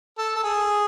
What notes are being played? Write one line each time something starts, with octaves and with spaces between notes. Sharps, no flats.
A4
A4
G#4